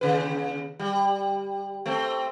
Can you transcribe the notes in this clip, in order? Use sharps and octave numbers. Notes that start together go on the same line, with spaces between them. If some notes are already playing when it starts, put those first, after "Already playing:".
D#2 C#3 B4
G3
A3 C4